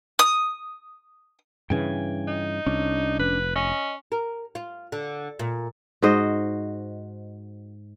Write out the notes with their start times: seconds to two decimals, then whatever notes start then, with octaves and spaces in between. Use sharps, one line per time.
0.19 D#6
1.70 G2 C#3 E3 G5 G#5
2.28 D#4
2.67 C2 C#4 D4
3.19 F1 B4
3.56 C#4 D#5
4.12 A#4
4.55 F4
4.92 D3
5.39 A#2
6.02 G#2 F#4 C5 D#5